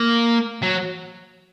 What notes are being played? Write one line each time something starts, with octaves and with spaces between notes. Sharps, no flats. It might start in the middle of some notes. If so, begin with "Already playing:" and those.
Already playing: A#3
F#3